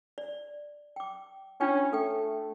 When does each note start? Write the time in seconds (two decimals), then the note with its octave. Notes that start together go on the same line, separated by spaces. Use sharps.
0.18 D5
0.96 G5 D6
1.61 C#4 D4 F4 G5
1.93 A3 A4 G5